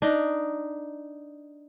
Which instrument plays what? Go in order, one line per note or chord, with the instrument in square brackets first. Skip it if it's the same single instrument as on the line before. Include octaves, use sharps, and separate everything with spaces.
[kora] D4 D#4